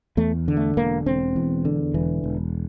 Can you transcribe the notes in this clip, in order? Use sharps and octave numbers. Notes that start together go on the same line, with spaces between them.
E2 A3
D3
A3
E1 A#3
E1 C4
E2
D3
E1 E3
E1